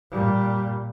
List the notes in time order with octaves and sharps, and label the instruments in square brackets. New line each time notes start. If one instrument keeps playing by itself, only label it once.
[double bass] A#2 G3